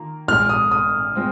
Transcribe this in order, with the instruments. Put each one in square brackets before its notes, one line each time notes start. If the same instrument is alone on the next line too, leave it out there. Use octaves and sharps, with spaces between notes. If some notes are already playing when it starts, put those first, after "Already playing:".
Already playing: [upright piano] D#3 A#3 F4
[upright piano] A#1 A#2 G#3 [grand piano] F6
[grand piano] D#6
D#6
[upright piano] G#3 C4 F4